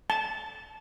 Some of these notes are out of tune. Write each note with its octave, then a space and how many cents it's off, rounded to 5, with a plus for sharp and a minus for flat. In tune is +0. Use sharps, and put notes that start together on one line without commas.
A5 -15